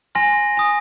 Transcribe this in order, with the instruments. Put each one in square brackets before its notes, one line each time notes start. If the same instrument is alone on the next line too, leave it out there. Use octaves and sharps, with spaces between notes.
[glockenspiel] G#5 C6 F6 A#6
G#5 D#6